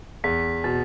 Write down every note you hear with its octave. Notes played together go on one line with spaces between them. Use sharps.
E2 B6
B2 A6